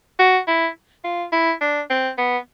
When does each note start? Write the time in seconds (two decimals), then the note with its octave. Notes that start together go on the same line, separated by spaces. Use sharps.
0.19 F#4
0.48 E4
1.04 F4
1.32 E4
1.61 D4
1.90 C4
2.18 B3